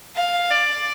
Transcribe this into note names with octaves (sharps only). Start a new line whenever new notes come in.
F5
D5